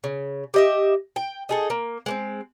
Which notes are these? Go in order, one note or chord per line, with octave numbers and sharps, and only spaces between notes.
C#3
G4 D#5 E5
G5
D#4 G#4 A4
A#3
G#3 A#3 C4